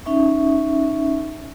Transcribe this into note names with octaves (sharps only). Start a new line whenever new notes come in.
C#4 D#4 E5 C#6